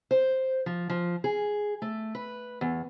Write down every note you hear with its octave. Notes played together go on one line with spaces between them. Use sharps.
C5
F3
F3
G#4
A3
B4
E2